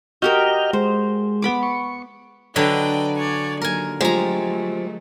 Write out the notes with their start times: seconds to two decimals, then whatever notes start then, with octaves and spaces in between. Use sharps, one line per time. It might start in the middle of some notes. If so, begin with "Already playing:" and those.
0.22 F#4 G4 A#4 D#5 F6 G6
0.73 G#3 C5
1.42 B3 B5 D6
1.63 C#6
2.56 D3 F#3 B4 D5 D#5 G5
3.17 C#5 D5 G#5
3.62 D#2 F#3 A#4 G#5
4.01 F3 F#3 G#3 A3 G4 A#5